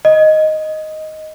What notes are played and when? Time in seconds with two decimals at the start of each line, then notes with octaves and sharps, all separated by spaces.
0.05 D#5